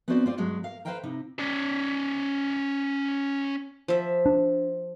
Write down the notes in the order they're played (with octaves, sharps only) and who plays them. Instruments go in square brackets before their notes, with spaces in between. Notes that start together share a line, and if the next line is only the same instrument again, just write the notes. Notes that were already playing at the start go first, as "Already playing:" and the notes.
[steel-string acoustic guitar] B3 C4 D4 F#4 C5 D5
C4 F4 D5
G2 F#3 G#3
A#4 F5
B4 C5 E5 F5 G5 A#5
C3 D#4 E4
[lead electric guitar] C#4 D5
[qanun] F3 E5
[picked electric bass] D4